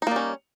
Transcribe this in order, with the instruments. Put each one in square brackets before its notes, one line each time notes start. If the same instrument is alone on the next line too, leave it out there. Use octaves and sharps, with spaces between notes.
[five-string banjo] D#4
A#3
G3
C#4